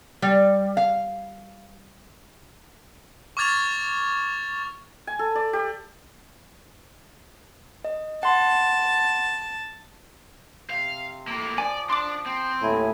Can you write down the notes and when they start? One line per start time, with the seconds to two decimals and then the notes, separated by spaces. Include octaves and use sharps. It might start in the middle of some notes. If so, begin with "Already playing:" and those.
0.22 G3
0.77 F5
3.37 C#6 D6 F6 G#6 A6 F7
5.07 G#5
5.19 A4
5.35 D5
5.53 G4
7.85 D#5
8.23 F#5 A5 C6
10.70 C3 F5
11.28 A2 A#3
11.58 F3 D5 G#5
11.90 D4 C6 D6
12.26 C4
12.62 D#2 A2 E4 G#5